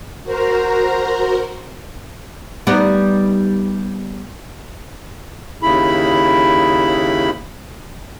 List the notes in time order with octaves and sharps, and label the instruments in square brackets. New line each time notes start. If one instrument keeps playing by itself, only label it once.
[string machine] F#4 A#4 C5 A#5
[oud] G3 B3 D#4
[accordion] D#2 C#3 E4 B5